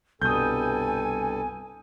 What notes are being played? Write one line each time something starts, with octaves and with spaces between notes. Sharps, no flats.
C2 G2 B2 A4 G#5 D#6 G6